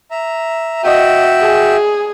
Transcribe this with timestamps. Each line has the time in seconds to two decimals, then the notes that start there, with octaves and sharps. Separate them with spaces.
0.11 E5 A#5
0.84 F#4 D#5 E5 G5
1.40 G#4